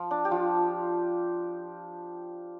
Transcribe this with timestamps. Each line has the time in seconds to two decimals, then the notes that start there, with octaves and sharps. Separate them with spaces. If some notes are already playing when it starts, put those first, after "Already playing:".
Already playing: F3 F4
0.11 D4
0.25 G4
0.31 F3 F4